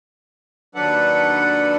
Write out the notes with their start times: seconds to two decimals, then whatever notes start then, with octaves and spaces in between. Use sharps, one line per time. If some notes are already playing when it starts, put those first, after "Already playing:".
0.75 D#2 F#3 D4 A4 B4 F#5